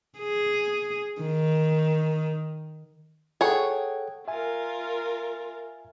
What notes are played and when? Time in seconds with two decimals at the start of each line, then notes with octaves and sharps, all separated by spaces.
0.19 G#4
1.21 D#3
3.41 G#4 A4 C#5 F#5 G5
4.28 F4 A#4 E5 G#5